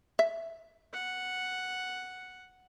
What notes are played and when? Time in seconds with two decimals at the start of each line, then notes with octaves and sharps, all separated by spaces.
0.19 E5
0.94 F#5